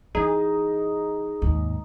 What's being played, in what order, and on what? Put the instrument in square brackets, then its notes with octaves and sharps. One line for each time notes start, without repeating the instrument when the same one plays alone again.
[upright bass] E3 [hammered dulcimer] D#4 [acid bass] G#4
[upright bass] D#2 G#2